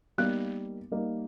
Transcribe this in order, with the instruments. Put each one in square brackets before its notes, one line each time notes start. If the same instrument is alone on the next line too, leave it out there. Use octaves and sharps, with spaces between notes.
[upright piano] G3 A#3 D#4 [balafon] B3
[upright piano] G3 A#3 D#4